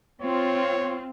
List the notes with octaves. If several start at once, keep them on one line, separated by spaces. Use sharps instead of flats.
C4 F4 C#5